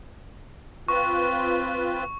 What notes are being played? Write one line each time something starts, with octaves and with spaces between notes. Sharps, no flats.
C4 F4 B4 C#6